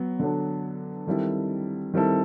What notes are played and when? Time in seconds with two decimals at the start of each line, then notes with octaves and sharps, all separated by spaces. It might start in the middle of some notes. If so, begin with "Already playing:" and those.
Already playing: F#3 B3
0.19 D3 F#3 B3 D4
1.07 D#3 G3 C4 E4 A4
1.94 D#3 G3 C4 E4 A4